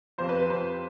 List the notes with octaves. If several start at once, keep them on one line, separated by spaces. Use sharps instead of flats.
F2 C3 F3 C5
B4
B4
F2 C3 F3 C5